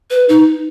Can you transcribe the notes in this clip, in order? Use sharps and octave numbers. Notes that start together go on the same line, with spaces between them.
B4
D#4